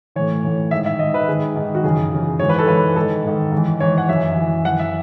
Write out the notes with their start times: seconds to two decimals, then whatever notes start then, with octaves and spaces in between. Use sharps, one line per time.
0.16 A2 E3 C#5
0.44 A2 E3
0.71 G#2 D#3 E5
0.86 E5
0.99 G#2 D#3 D#5
1.14 B4
1.28 G#2 D#3 G#4
1.56 G#2 D#3
1.75 F#4
1.83 F#2 C#3 E3 G#4
2.12 F#2 C#3 E3
2.39 G#2 E3 C#5
2.49 B4
2.59 A4
2.68 G#2 E3 B4
2.96 G#2 D#3 A4
3.24 G#2 D#3
3.52 G#2 E3
3.80 G#2 E3 C#5
3.98 F#5
4.09 F#2 E3 E5
4.36 F#2 E3
4.64 F#2 E3 F#5
4.79 E5